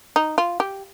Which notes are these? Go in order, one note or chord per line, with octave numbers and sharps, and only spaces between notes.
D#4
F4
G4